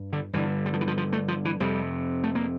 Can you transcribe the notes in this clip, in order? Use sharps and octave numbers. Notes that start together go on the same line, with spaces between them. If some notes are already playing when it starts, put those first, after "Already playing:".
Already playing: G2
D3
G2 D3 E3
G3
F3
E3
F3
F3
A3
F3
E3
F2 C3 G3
A3
A#3